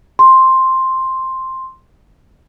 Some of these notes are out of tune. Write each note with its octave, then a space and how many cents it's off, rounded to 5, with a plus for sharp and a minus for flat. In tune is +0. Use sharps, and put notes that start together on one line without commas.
C6 +5